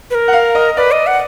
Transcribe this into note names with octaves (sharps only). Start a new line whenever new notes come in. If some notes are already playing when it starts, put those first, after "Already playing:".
B4
A#4
F#5
F5
D#5
B4 D5
D#5
F#5